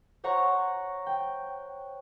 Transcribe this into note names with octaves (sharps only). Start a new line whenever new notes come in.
C5 C#5 F#5 A#5 C#6
G5